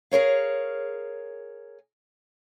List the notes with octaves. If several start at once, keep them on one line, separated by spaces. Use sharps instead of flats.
G#4 A#4 C#5 F5